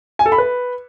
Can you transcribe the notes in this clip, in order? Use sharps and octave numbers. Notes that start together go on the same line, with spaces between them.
G#5
A4
B5
B4